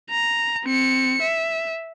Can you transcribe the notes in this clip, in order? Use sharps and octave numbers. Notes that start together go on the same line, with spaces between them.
A#5
C4 C#7
E5